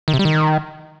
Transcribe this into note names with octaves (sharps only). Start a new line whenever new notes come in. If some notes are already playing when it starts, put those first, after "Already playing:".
D#3
C3
G3
D#3